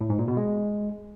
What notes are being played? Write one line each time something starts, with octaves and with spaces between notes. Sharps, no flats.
A2
G#2
A#2
B2
G#3